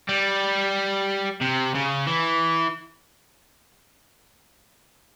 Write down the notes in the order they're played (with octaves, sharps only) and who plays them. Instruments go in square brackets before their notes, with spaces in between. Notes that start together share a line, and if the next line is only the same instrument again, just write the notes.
[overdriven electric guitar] G3
C3
C#3
E3